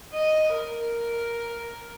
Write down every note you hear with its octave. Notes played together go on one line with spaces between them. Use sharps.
D#5
A#4